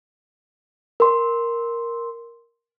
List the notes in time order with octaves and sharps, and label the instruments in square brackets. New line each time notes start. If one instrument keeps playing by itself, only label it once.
[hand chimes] A#4 C6